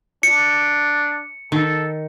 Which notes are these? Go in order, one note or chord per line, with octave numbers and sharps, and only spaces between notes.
D4 C#7
D#3 A4